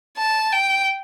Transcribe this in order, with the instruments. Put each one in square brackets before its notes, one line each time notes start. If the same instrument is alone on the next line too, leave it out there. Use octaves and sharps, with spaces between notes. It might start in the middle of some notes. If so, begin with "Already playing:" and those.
[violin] A5
G5